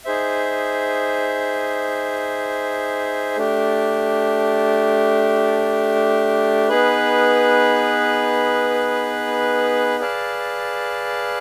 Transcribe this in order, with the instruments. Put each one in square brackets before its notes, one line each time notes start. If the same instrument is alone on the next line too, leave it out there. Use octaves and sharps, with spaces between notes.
[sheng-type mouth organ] D#4 G#4 C5 E5
A3 D4 G4
B3 D#4 G#4 B4
G#4 B4 D5 F5 A5